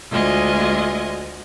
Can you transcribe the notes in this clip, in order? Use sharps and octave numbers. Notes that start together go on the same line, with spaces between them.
D2 G#3 F4 D#5 G#5